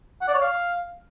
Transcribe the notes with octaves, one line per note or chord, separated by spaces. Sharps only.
F#5
D5
C#5
F5